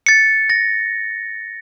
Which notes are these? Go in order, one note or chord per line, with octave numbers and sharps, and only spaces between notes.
A6 C#7
A#6